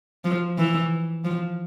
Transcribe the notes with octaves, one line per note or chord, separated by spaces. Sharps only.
F3
E3
F3